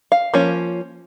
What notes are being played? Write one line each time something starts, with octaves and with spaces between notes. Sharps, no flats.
F5
F3 A#3 C#4